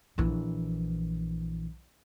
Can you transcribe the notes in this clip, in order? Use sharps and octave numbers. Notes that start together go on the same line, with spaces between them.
A#1 E3